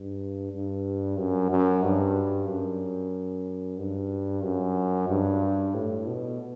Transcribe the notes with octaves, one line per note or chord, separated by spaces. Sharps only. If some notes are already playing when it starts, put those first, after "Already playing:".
Already playing: G2
G2
F#2
F#2
G2
F#2
G2
F#2
G2
A2
B2